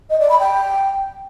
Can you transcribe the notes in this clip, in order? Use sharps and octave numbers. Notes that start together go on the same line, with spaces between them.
D#5
D5
B5
G5